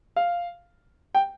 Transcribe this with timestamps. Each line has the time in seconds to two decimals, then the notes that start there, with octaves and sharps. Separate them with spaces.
0.16 F5
1.15 G5